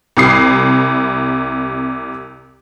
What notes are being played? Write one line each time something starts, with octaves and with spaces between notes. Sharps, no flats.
C2 C3 D#6 C7